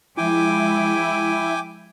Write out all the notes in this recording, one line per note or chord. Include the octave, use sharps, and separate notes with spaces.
F3 G#3 E4 G5 G#5 D6